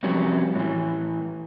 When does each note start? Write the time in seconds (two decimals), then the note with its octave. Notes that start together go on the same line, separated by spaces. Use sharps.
0.03 F2 C3 F#3 G3 C#4
0.55 A2 E3